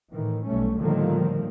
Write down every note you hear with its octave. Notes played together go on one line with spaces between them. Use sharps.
A2 D#3 E3
B1 G3 A3 C#4
A2 D3 D#3 F3 G3 A#3